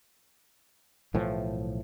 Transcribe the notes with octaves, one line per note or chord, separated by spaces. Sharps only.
B1 A2 E3 F3